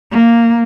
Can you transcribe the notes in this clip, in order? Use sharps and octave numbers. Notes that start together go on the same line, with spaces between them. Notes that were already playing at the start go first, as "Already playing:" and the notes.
A#3